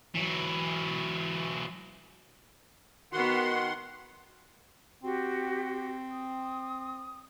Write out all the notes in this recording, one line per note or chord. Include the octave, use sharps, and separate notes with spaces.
E3 F#3
D#3 B3 F#4 F#5 C6
C4 F#4 G4
D#6